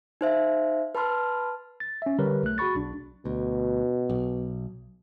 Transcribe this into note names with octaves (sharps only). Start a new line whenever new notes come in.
D#4 C5 E5 F5
B4 A5 B5 C6 F6
A6
C#4 E5
D3 G3 G4 A#4 B4 C#5
B1 A3 F#6
F#4 G#4 B5 C#6 A6
B1 D4
D2 B2
B1